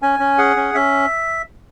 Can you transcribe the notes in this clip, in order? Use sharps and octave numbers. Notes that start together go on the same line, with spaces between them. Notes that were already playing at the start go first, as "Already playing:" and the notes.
C#4 G#5
C#4
G#4 F#5
C#4
C#4 E5